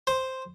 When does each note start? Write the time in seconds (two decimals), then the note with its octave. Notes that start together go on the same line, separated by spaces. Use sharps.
0.07 C5